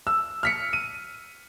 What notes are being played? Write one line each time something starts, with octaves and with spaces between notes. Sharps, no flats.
E6
F6 B6 C#7
D#7